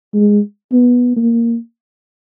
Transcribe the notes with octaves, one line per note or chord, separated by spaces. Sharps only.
G#3
B3
A#3